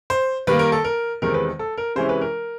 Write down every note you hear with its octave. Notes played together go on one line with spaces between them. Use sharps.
C5
D#3 G3 A#3 B4
A#4
A4
A#4
E2 C3 D#3 G#3 C4 A#4
B4
A4
A#4
C3 E3 G#3 C#4 E4 C5
B4
A#4